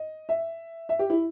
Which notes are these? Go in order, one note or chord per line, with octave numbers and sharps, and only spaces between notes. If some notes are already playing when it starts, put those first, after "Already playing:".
Already playing: D#5
E5
E5
G4
E4